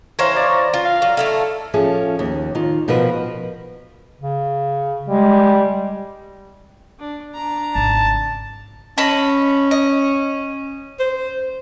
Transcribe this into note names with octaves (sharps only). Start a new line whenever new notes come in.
E3 C5 C#5 F5 A#5
D5 A#5
F4
F5
F#3
A3 E4 A4 F5
F3 C#4 G#4 A4 E5
D#2
D#3 F4
B2 F3 F#4 A#4 B4
C#3
G3 G#3
D4
D4 A#5
G#1 C#3 A5
C#4 D#5 A5 B5
D#5
C5